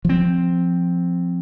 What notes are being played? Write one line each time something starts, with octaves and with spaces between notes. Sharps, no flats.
F3 C4